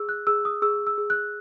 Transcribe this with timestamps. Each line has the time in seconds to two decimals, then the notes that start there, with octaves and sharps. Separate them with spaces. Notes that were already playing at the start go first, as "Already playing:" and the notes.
Already playing: G#4 E6
0.09 F#6
0.27 G#4 E6
0.45 D#6
0.62 G#4 E6
0.87 E6
0.98 G#4
1.10 F#6